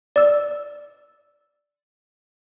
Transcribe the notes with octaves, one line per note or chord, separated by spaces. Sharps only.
D5 E6